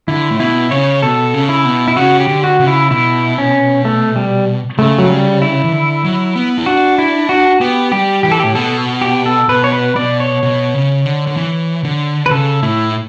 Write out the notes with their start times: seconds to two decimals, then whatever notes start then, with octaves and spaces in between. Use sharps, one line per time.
0.08 D3 E4
0.31 A2
0.40 B2 E4
0.71 C#3 C#5
1.02 B2 A4
1.34 C#3
1.49 E4
1.65 B2
1.88 E4
1.96 C#3 F#4
2.20 G4
2.28 D3
2.44 F#4
2.60 C#3
2.67 E4
2.91 B2 E4
3.38 C#4
3.85 A3
4.16 G3
4.79 C#3 A3
4.99 F#3
5.10 G3
5.42 E4
5.64 E3
5.72 D3
6.04 F#3
6.36 B3
6.58 E4
6.66 D4 F#4
6.98 E4
7.29 F#4
7.61 B3 G4
7.92 G3 G4
8.23 E3 G4
8.32 A4
8.40 A2 G4
8.55 B2 A4
9.01 G4
9.26 A4
9.49 B2 B4
9.64 C#5
9.72 B4
9.96 B2 D5
10.20 C#5
10.43 B2
10.74 C#3
11.06 D3
11.27 D3
11.37 E3
11.84 D3
12.26 B4
12.31 C#3 A4
12.63 A2 E4